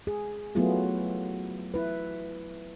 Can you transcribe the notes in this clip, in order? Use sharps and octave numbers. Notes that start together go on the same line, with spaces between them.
G#4
F#3 A3 B3 E4 F4 G#4
E4 B4